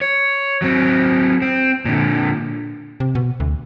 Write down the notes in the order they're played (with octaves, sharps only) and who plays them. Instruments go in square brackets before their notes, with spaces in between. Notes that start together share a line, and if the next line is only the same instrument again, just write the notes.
[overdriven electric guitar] C#5
F#3 C4
C4
A#2 D3
[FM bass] C3
B2
D2